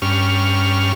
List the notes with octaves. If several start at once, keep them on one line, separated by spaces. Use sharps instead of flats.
G2 C#4 F6